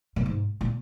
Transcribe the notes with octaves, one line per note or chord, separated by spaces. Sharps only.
A#2
G#2
A#2